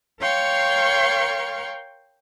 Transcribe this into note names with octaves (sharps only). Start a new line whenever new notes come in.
A#4 C#5 F5 G5 C6 C#6